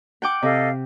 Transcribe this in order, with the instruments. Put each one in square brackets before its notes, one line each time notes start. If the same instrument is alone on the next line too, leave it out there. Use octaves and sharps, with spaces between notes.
[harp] F#5 G5 D6
[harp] C3 [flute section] A4 D#5 F5